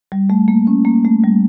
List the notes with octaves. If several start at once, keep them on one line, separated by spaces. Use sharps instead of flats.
G3
A3
A#3
C#4
A#3
A3
G3